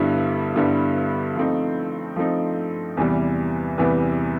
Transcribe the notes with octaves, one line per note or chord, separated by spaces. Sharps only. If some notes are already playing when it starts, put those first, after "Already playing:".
Already playing: G2 D3 G3 B3 E4
G2 D3 G3 B3 E4
F3 A3 C4 D#4
F3 A3 C4 D#4
E2 C3 E3 G3 B3
E2 C3 E3 G3 B3